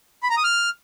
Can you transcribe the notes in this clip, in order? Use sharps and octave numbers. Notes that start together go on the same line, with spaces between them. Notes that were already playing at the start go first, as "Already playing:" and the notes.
B5
A#5
D#6
F6